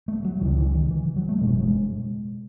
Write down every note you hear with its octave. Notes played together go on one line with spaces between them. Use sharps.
A3
F#3
C#2 C#3 E3
E3
D#3
E3
F#3
A3
F#1 E2 B2 G#3
F#3
G#3